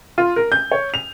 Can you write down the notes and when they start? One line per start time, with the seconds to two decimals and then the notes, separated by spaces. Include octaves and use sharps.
0.18 F4
0.36 A#4
0.52 G6
0.72 C#5
0.94 F7